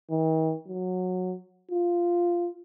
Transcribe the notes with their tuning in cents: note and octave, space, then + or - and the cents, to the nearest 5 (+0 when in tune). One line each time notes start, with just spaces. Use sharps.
D#3 +45
F#3 -15
F4 -5